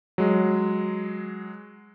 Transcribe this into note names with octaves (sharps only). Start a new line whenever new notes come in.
F#3 G#3